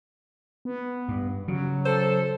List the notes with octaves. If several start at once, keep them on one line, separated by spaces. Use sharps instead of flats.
B3
G2
C#3 F#3
A4 C5